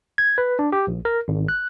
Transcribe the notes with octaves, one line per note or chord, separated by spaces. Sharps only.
G#6
B4
D4
G4
A#1
A#4
G#1
F#6